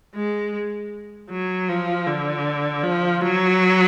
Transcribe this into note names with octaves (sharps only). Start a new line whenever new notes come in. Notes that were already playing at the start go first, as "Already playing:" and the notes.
G#3
F#3
F3
D3
F3
F#3